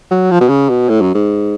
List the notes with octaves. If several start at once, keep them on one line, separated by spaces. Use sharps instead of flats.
F#3
F3
B2
C#3
B2
A2
F#2
G#2